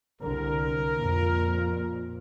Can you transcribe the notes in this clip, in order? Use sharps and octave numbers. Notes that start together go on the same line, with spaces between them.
C2 D3 A#4
F2 A#2